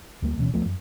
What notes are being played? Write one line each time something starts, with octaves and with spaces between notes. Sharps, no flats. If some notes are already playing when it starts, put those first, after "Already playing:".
D2 G3 A#3
D1 B2 E3 C#4
C#2 F3 A3 B3
F#2